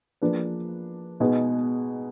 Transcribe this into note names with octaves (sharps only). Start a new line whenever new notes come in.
F3 A#3 D4 G#4 B4
B2 G#3 D#4 G#4 B4